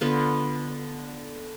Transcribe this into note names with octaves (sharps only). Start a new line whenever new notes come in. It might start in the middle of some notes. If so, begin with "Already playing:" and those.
D3 B3 F4